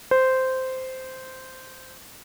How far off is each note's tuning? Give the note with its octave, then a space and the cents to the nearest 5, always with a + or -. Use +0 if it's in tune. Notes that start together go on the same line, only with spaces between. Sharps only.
C5 -10